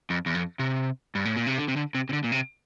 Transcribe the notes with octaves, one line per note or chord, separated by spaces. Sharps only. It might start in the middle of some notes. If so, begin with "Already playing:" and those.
F2
E2
F2
C3
G2
A2
A#2
C3
D3
C3
D3
C3
C3
D3
A#2
C3